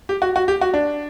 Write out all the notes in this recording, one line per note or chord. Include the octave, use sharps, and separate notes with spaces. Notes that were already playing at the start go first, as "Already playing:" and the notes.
G4
F#4
F#4
G4
F#4
D4